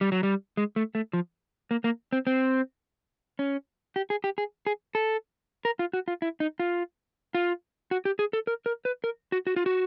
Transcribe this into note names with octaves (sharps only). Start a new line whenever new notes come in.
G3
F#3
G3
G#3
A3
A3
F3
A#3
A#3
C4
C4
C#4
G4
G#4
G4
G#4
G#4
A4
A#4
F4
F#4
F4
E4
D#4
F4
F4
F#4
G4
G#4
A4
A#4
A#4
B4
A#4
F#4
F#4
F4
F#4